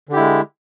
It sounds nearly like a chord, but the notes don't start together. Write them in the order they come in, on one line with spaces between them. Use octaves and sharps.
D3 G4 E4 G#3